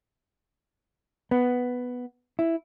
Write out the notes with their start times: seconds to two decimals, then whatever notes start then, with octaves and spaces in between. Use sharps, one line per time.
1.31 B3
2.39 E4